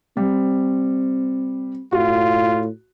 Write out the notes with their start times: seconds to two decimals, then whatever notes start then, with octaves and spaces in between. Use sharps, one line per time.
0.17 G3 C4
1.92 A2 F4 F#4